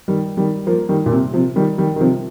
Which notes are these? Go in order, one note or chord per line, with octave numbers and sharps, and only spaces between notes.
D#3 G3
D#3 G3
F3 A#3
D#3 G3
A#2
C3
C3 F3
D#3 G3
D#3 G3
D#3
C3 F3